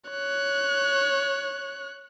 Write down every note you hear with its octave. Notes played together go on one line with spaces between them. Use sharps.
C#5 F#6